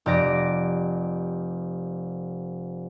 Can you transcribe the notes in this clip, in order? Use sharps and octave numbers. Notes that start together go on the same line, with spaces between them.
F1 G4 D5 A#6 D7